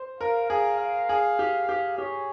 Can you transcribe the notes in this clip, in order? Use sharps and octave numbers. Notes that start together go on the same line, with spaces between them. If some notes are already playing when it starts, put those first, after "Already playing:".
Already playing: C5
A#4 F5
G#4 F5
F5
G#4
G4
G4
G4 C#5